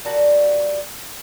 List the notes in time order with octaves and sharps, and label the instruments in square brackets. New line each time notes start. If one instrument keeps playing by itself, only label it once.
[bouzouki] G3 A#3 F#4 A5